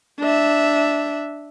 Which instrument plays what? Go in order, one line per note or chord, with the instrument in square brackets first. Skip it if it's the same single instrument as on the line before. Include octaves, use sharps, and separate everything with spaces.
[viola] D4 E5